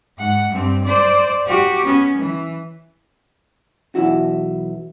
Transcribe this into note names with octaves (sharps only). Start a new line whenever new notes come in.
G#2 F#5
G2 C4
C5 D5
F#4 G4
B3 C#4
E3
B1 E2 E4 F#4